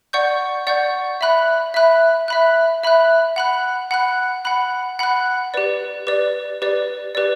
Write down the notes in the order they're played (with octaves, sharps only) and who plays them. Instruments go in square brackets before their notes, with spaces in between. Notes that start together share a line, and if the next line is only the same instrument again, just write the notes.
[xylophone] D5 F#5 C#6 G6
D5 F#5 C#6 G6
E5 B5 F#6
E5 B5 F#6
E5 B5 F#6
E5 B5 F#6
F#5 B5 F#6
F#5 B5 F#6
F#5 B5 F#6
F#5 B5 F#6
G4 B4 D5
G4 B4 D5
G4 B4 D5
G4 B4 D5